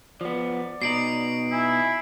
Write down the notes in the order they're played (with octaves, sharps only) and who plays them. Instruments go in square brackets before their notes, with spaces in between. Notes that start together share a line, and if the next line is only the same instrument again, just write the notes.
[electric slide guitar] F3 B3 [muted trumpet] D5
[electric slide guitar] B2 D#4 [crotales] C7 D7 F#7
[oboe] E4 [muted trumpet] G#5